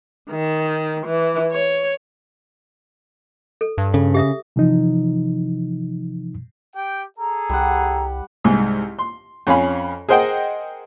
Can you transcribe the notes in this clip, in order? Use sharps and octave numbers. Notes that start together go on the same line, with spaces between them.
D#3
E3
C#5
A4
G2
C#3 A4
G4 E5 D#6
C3 E3 F3 D#4
G4 G5
G#4 A4 A#5
C2 G3 F#5
C2 G#2 G#5
C6
F2 C#4 C#5 F5 G#5 B5
G#4 A#4 C5 D#5 F#5 G5